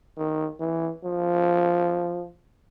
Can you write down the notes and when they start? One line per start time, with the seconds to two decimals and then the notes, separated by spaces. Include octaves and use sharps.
0.17 D#3
0.60 E3
1.04 F3